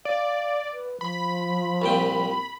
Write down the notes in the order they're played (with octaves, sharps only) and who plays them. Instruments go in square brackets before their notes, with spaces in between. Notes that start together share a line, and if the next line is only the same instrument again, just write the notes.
[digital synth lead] D5 [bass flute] F5
[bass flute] B4
[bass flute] F3 [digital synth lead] B5
[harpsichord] C2 A#2 G5